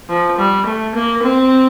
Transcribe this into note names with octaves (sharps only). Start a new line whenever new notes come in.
F3
G3
A3
A#3
C4